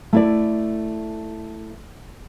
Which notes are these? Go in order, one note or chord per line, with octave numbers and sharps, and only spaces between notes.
A3 E4 D5